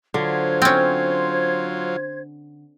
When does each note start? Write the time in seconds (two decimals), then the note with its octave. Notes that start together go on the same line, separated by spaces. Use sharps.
0.14 D3 F#3 F4 C5 G#6
0.62 C4 C#4